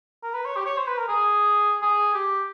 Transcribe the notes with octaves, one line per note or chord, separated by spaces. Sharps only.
A#4
B4
C#5
G4
C#5
C5
B4
A#4
G#4
G#4
G4